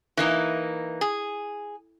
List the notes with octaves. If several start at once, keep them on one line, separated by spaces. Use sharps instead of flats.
E3 A#3 D#4
G#4